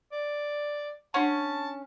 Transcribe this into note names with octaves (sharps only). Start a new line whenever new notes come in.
D5
C#4 D4 F#5 A5